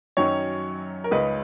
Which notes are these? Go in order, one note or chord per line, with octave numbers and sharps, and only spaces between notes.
F#2 D#3 F#3 C#4 C#5
A#4
C#2 C#3 G#3 D#4 B4